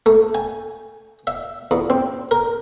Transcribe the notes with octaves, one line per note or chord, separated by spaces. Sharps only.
A3
G#5
E5
E2
C4
A#4